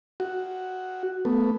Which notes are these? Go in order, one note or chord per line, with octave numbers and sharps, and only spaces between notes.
F#4
A3 B3